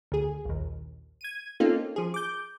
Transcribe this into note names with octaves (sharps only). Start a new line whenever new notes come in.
D2 G#4
A#1 D#2
G#6 D#7
A#3 C4 C#4 D#4 F4 A4
F3 G#4
D6 G6